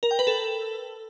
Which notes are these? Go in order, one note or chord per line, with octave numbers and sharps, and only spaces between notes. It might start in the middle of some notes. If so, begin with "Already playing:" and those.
A#4
G5
B4
A4